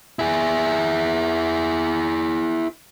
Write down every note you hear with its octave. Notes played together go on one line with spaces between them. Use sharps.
E4 G#4